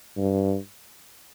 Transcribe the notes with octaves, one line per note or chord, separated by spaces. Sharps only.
G2